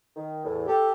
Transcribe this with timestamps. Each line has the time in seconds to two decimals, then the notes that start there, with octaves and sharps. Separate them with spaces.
0.16 D#3
0.44 E2 A2
0.67 G4 A4